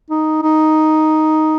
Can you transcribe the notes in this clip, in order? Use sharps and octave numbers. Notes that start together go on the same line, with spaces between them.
D#4
D#4